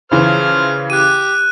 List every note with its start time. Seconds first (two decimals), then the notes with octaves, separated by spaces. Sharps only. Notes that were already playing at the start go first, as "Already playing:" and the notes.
0.11 C#3 E3 C5 F6
0.90 G4 F#6 D#7